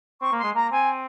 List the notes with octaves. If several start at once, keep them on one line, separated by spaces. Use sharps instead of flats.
C4 C#6
A#3
C6
G#3
A#3 A#5
C4 G#5